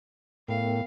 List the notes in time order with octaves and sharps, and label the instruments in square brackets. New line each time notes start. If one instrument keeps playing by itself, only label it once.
[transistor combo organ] A2 [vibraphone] B3 A#4 G5 [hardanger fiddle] F5